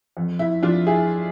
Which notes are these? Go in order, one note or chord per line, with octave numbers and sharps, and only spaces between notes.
F2
E4
F2 D4 F4
E4 G#4